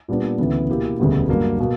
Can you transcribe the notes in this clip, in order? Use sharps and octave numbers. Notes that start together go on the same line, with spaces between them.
A#2 G3 B3 D4
D2 C#3 E3 B3
B2 A#3 E4 G4
E1 D2 C#3 G3 B3
G2 F#3 A#3
B2 A#3